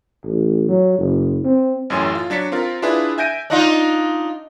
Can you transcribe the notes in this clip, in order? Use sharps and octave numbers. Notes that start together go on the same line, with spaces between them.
A1
F#3
F#1
C4
A1 F#2 A2 G#5 C6
F4
F#3 D4 A6 B6 C#7
C4 F4 A#4
D4 E4 F4 G#4 B4
E5 G#5 G6 A#6 D7 D#7
D4 D#4 F4